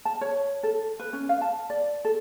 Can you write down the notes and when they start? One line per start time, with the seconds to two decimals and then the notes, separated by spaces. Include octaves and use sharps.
0.05 A5
0.21 C#5
0.63 A4
1.00 B4
1.13 C#4
1.29 F5
1.42 A5
1.70 D5
2.05 A4